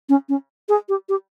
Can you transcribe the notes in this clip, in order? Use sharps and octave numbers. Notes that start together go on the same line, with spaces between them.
C#4
C#4
G#4
G4
G4